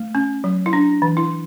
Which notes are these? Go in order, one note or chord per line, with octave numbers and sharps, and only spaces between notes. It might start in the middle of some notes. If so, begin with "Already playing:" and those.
Already playing: A3
C#4
F#3
E4
D4
E3
E4